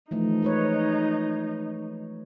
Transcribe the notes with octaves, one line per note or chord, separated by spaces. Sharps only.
E3 F3 A3 D#4
G#3 B4 C#5